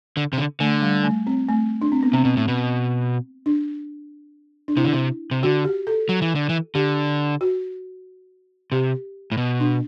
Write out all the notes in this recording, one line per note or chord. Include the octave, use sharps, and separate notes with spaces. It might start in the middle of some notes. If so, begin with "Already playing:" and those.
D3
C3
D3
D3 A3
G3
A3
C4
A3
D4
C4
B3
C3 C4
B2
A2
B2
D4
D4
C3 E4
D3
C3
C3
D3 F#4
G4
A4
F#3
E3
D3
E3
D3 G4
F#4
C3 G4
A2
B2
D4